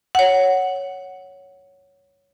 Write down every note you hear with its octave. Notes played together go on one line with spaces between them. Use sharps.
C#5 F#5